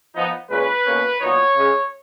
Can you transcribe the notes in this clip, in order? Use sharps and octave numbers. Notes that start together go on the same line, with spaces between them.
F3 B3 D#4
A#2 G#3 C#4 B4
B2 A#3 C#4
A#2 F#3 B3 D#4 C#5
C#3 G#3 C#4